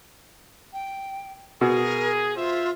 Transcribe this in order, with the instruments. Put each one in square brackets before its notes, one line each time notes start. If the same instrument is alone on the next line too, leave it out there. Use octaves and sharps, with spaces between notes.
[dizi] G5
[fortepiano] B2 [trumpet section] G#4 [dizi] A#4
[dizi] F4 [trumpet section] C5 E5